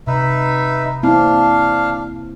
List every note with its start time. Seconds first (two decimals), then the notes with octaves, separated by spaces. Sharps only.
0.07 C3 D#4 B4 E5
1.03 A#3 C4 D4 E4 F5